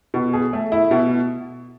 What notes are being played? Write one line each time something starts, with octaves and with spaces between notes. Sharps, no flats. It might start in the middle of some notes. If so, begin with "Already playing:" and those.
B2
G#4
A3
E4
B2